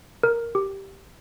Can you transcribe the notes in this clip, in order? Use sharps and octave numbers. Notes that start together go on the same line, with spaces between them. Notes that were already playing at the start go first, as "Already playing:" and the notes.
A#4
G4